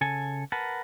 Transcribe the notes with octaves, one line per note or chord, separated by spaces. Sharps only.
C#3 A4 G#5
A#4 B4 F#5 A5